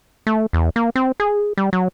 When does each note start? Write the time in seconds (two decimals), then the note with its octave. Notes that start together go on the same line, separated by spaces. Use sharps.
0.27 A3
0.53 E2
0.76 A#3
0.95 C4
1.20 G#4
1.58 G3
1.73 F#3